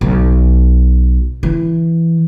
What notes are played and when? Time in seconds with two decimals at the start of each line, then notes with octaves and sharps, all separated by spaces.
0.01 B1
1.43 E3